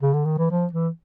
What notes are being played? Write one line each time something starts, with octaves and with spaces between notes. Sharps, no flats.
C#3
D3
D#3
E3
F3
E3